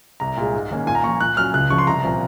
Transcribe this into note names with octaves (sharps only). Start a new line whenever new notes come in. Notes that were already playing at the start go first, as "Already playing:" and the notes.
C2 A#5
A#2 G#3
G#2
D#3 A#3 C#4
A#2 G#5
A#5
F3 A#3 C#6
A#2 F#6
F#3 C#4 F6
C#2 F#6
C#3 F3 C#6
C6
C2 A#5
A#2 F3 C4